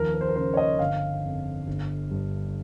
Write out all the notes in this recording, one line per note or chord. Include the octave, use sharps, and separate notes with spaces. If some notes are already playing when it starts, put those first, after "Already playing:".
Already playing: D#2 F3 A#4
A#4
C5
A#4
C#3 C5
C#5
D#5
G1 F5
F2
G1
G2